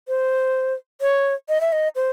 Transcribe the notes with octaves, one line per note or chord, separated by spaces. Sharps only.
C5
C#5
D#5
E5
D#5
C5